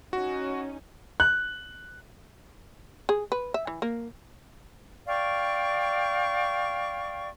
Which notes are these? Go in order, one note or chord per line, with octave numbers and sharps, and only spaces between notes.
C#4 D#4 F#4
F#6
G#4
B4
E5
E3
A#3
D5 F5 G5 C#6